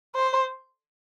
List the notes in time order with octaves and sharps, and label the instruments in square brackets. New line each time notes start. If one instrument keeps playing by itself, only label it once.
[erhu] C5